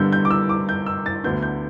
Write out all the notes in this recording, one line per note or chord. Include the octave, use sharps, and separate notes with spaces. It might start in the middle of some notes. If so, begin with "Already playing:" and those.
Already playing: G2 D3 G3 B3 D4 E6 G6
G6
D6
E6
D6
G6
E6
A6
D2 D3 B3 D4 G6
G6